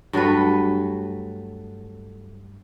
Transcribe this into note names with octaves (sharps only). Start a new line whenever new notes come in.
G2 F#3 A3 B4